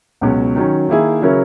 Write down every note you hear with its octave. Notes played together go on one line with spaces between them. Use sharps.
C#2 B2 F#3 C#4
D#3 F#3 C#4
D#3 A#3 E4 G#4
C#3 F#3 C#4 E4 A#4